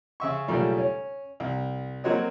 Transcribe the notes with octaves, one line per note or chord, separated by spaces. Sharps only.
C#3 E5 C#6
B1 A#2 C#3 G3 A3
C#4
C2
F#3 A#3 C4 F#4 C#5 D#5